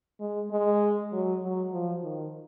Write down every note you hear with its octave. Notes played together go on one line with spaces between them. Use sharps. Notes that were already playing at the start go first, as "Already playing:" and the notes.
G#3
G#3
F#3
F#3
F3
D#3